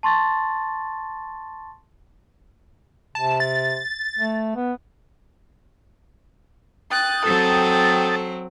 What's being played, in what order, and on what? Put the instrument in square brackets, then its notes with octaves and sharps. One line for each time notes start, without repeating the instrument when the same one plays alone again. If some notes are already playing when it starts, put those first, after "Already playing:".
[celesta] A5 C6 C#6 A6
[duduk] C3 [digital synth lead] A5
[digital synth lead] A6
[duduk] A3
B3
[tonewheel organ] G5 D#6 A6 [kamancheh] F#6
[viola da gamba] F#3 C4 [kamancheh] A4